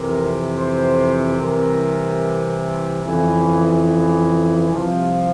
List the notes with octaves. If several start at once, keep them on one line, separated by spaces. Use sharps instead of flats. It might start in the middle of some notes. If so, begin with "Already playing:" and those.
Already playing: F2 C3 E3 A#4
C5
C2 C3 E3 A#4
F2 C#3 E3
C2 C3 F3